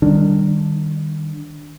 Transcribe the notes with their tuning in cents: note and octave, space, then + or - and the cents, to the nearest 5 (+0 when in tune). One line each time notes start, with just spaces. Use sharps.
D#3 -15 G3 +10 D4 +0